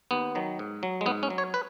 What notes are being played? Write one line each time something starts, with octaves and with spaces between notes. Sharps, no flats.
D#2 B3
D#3 F#3
G#2
F#3
G#3
G#2 B3
C#4
F#3
C#5
B4